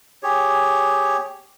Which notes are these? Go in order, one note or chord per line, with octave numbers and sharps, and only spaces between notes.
G4 G#4 C#5